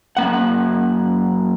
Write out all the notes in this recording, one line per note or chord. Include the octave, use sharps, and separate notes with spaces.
F#2 A#3 F#5